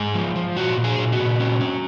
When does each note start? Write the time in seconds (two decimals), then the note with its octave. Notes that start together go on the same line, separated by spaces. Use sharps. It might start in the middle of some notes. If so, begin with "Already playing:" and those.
Already playing: G#2 G#4
0.14 F3
0.36 F3
0.56 A#2 F#4
0.77 A#2
0.84 G#4
0.98 A#2
1.12 F#4
1.19 A#2
1.40 C#4
1.61 C#4